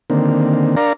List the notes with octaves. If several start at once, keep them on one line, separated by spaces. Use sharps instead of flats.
D3 D#3 A#3 C4
D4 A#4 D5 F5 A#5